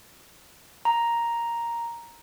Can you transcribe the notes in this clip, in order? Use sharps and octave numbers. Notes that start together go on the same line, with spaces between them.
A#5